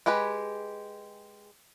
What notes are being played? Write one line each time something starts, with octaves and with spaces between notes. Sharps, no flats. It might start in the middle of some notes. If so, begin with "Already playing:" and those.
G#3 G4 G#4 B4